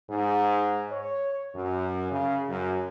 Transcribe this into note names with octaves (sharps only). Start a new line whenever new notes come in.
G#2
C#5
F#2
C#3
F#2